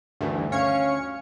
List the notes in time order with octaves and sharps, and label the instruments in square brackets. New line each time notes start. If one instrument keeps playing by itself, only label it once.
[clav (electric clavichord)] D2 A3 [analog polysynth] G2 D#3 E3
[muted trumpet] C#4 [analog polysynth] C#5 C#7 [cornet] F5